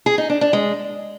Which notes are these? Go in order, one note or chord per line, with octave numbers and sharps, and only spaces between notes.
G#4
D#4
D4
D4
G#3